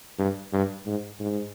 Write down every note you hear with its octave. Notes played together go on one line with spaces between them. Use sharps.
G2
G2
G#2
G#2